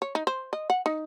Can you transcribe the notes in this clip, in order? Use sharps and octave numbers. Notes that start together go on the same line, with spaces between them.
C#5
D#4
C5
D#5
F#5
D#4